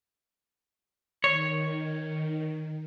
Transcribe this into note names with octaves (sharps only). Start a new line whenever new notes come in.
D#3 C#5